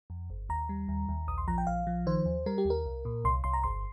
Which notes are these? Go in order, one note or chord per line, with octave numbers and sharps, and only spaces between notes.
F2
G1
D#2 A#5
G3
D#2
D#2
A#1 D#6
C6
F3 A#5
G5
A#1 F5
F3
D#3 C5
D#2
G3 A#4
G4
D#2
A#4
C2
A#2
C2 C6
C2 C6
A#5
G1 C6